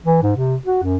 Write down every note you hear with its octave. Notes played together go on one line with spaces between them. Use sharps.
E3
G#2
C3
F#4
F#2